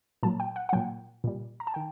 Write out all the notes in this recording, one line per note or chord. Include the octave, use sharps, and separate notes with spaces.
A#2 F#3 A5
G5
F#5
F#5
A#2 F#3 G5
A#2 G3
A#5
A5
D#3 G5